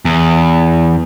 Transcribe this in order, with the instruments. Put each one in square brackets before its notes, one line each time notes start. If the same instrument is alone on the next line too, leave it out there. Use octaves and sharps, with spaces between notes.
[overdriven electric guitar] E2